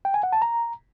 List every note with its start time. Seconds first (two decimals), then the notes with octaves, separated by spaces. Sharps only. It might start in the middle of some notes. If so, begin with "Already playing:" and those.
0.05 G5
0.14 G#5
0.23 F#5
0.32 A5
0.42 A#5